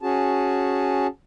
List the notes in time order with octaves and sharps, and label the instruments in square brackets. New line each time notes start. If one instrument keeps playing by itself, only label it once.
[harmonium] C#4 F#4 G#4 A5